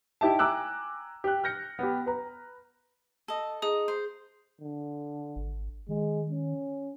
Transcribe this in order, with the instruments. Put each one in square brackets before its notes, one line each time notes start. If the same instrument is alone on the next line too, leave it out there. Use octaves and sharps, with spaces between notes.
[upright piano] D#4 E4 G4 E5 A5
G5 G#5 A#5 D6 E6 F#6
G4 F#6
F6 G6 A#6 C#7
B3 G4
B4 A#5
[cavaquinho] A4 D#5
[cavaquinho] D#4 [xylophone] G#4 D#6
[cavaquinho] C5
[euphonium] D3
[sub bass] G#1
[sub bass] D#3 [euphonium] G#3
[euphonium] C#4